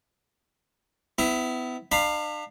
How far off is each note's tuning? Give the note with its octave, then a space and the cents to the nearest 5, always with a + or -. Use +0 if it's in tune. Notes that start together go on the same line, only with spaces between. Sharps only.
B3 +35 E4 +0
D4 +40 F5 +0 B5 +0